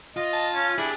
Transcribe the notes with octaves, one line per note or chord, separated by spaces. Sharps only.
F4 D#5
A5
C#4
D4 E4 G4 G#4